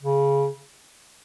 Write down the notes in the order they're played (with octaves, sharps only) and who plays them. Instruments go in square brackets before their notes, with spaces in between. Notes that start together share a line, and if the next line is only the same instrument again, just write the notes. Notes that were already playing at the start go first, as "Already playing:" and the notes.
[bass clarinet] C#3